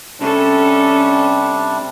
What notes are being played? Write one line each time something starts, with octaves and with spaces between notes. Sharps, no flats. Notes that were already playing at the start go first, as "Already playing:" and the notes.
C3 G3 C#4 D4 A4